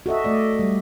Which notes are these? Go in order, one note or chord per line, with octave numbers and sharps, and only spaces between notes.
F#4 A4 D#5 E5
A3 D5 D#5
G3